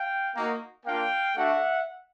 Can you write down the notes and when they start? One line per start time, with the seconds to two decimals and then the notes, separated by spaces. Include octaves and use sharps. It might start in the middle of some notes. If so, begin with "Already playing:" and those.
Already playing: F5 G5
0.35 A#3 D#4 F#4
0.85 A#3 D4 F4 F5 G5
1.35 A3 D4 F#4 E5 F#5